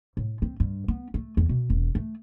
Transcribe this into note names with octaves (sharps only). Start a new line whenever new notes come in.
A2
C4
G2
B3
A3
E2
B2
E1
A3